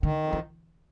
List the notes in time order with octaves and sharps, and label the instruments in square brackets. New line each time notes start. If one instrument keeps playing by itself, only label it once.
[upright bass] D3 [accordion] D#3
[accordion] F2
[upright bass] E3